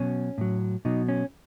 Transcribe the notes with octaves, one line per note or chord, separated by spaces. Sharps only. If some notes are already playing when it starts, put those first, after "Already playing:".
Already playing: B2 F#3 C#4
A2 F#3
B2 F#3 D#4
C#4